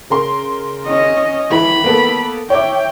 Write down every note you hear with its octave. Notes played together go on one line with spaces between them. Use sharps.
C#3 A#4 C6
C#4 D#5
E3 B5
A#3 B3 A4
C#5 E5 G5 D6